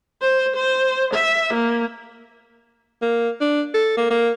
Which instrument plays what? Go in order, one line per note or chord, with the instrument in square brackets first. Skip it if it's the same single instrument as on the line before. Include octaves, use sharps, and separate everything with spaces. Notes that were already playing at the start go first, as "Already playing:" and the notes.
[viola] C5
C5
E5
A#3
[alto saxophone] A#3
D4
A4
A#3
A#3